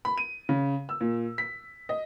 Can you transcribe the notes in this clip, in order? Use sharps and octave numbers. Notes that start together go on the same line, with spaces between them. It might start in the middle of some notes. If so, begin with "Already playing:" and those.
B5
D#7
C#3
E6
A#2
B6
D#5